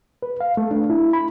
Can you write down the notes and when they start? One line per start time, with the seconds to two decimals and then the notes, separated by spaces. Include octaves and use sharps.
0.22 B4
0.40 F5
0.57 A3
0.71 D4
0.90 E4
1.13 B5